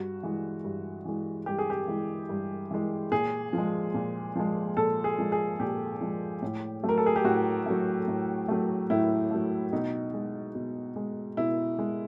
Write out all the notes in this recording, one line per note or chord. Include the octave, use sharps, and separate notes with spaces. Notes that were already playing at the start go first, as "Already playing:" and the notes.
Already playing: G2 F#4
E3 G#3
G2
E3 G#3
G2 G4
G#4
G4
E3 G#3
G2
E3 G#3
A#2 G#4
F3 G#3
A#2
F3 G#3
A#2 A4
G#4
F3 G#3
G#4
A#2 G4
F3 G#3
A2
F#3 A3
A#4
A4
G#4
G4
A2 F#4
F#3 A3
A2
F#3 A3
A2 E4
F#3 A3
B2 D#4
G#3
B2
G#3
B2 E4
G#3